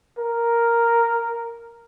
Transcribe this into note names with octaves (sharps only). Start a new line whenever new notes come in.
A#4